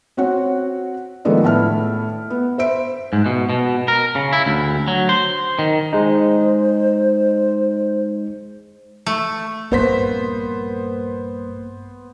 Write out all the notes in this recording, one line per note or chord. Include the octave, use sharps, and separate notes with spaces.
C4 F#4 C#5 F#5
D#3 F3 G#3 A3 B3 D4
A2 B3 E5 A5 F6
B3
C5 E5 D7
G#2
B2
B2
A#4
C#3
E4
D2
F#3
C5
D#3
G#3 D#4 C5
A3
A#1 G2 A#3 B3 C5 B6